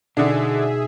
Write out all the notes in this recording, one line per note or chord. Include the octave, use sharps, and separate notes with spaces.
B2 D3 D4 D#4 F#4 G#4 E5